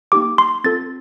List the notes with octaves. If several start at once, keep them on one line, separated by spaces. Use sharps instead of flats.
A#3 D#4 G4 D6
C6
C4 F4 A4 A6